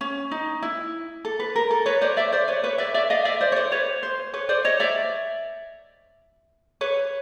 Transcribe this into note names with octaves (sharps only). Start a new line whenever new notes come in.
C#4
D#4
E4
A4
B4
A#4
A4
B4 C#5
C5 D5
D5 E5
C5 D5
B4 C#5
B4 C#5
D5 E5
D5 E5
D#5 F5
D5 E5
C5 D5
C#5
C5 D5
B4 C#5
C5
B4 C#5
C5 D5
C#5 D#5
D5 E5
B4 C#5